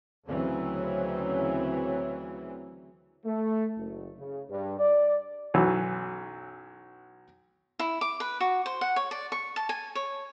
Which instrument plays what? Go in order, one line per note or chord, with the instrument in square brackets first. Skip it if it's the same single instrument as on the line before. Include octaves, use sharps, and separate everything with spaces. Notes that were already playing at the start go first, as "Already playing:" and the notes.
[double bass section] D2 C#3 E3 F#3 C4 C#4
[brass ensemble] A3
F#1
C#3
G2
D5
[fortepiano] B1 F#2 E3 F#3
[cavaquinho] E4
D6
B4
F#4
C5
F#5
C#5
D5
C#6
A5
G#5
C#5